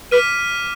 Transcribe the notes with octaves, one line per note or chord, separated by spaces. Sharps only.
B4 D6 F6 B6 D#7